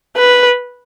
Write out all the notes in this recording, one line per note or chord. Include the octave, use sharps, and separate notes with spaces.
B4